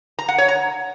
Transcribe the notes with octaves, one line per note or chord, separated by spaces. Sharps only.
A#5
F#5
C#5
A#5